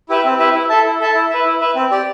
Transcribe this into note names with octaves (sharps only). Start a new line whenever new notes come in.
E4 G4 B4 E5
C4
E4 G4 B4 E5
E4
A4 E5 A5
E4
A4 E5 A5
E4
B4 E5
E4
B4 E5
C4
G4 D5